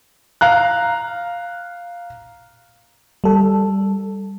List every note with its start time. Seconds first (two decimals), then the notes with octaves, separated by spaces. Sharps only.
0.41 F5 A#5 F#6
3.24 G3 A4